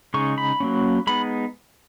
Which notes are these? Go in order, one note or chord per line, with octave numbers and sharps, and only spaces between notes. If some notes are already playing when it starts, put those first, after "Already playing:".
C#3 G#3 D#4 C#6
B5
F#3 A#3 C#4
G#3 B3 D#4 B5